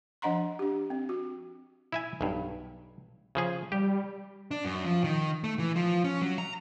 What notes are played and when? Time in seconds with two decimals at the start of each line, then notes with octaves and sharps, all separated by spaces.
0.22 F3 D4 D#5 F#5 A#5 C6
0.59 D4 G4
0.90 C4
1.09 F#4
1.92 E4 E5 G#5
2.21 B1 G2
3.35 C#3 F3 G#4
3.72 G3 G4
4.51 D4
4.65 F#2
4.85 F3
5.04 D#3
5.44 A3
5.59 E3
5.76 F3
6.04 C#4
6.22 F#3
6.38 A#5